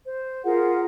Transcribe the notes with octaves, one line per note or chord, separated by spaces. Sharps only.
C5
F4 G#4 A#4 F#5